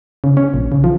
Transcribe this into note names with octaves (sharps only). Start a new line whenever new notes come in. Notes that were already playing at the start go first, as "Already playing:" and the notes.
C#3
C#4
A#1
C#3
F3